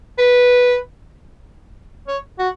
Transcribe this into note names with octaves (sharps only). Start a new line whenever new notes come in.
B4
C#5
F#4